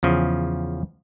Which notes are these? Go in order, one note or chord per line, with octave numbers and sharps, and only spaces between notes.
E2 C#3 F3